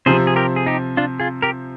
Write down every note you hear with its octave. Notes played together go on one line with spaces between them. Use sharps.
C3 F3 C4 G#4 C5
G#4
G4 A#4
G#4
D#4 G4
D4 F4
F4 G#4
G4 A#4